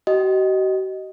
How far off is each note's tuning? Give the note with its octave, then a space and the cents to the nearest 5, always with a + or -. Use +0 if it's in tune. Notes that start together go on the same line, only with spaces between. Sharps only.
F#4 +45 D#5 +0 G5 +0